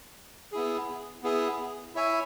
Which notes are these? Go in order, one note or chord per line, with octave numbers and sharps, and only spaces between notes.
B3 E4 G#4
B3 E4 G#4
E4 C#5 E5 G#5